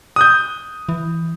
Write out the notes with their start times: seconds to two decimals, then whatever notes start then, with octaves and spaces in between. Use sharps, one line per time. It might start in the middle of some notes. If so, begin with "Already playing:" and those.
0.16 D#6 F#6 G6
0.89 E3